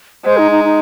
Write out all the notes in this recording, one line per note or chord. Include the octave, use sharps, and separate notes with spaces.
G#3 C5
D#4
D#4
D#4